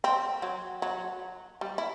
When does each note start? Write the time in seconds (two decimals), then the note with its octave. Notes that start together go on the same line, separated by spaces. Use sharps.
0.04 C4
0.42 F#3
0.82 F#3
1.61 G3
1.78 E4